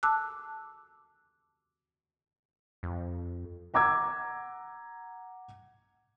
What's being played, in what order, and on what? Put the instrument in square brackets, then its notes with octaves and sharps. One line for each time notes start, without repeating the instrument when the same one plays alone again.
[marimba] A5 D6 E6 F#6
[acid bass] F2
[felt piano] F#5 A#5 D6 E6 G#6